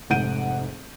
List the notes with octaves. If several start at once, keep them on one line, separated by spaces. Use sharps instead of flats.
F1 G#2 F#5 G6 D7 D#7